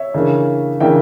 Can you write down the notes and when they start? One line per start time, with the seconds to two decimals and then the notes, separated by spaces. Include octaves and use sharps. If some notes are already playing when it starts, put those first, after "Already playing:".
Already playing: C#5 E5
0.14 C#3 E3 A#3 D4
0.80 C#3 E3 A#3 D4 E5 G5